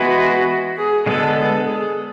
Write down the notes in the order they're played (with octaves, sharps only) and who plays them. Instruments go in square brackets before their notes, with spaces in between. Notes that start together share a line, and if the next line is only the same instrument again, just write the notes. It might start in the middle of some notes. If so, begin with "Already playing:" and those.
Already playing: [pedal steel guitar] E3 G#3 B3 E4 B4 [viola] F#4
[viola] G#4
[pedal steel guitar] D3 G#3 B3 [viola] A4
[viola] A4
G#4